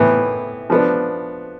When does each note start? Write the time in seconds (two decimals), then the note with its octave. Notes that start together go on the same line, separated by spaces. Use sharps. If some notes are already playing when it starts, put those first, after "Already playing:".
Already playing: A2 E3 B3
0.70 F3 B3 D4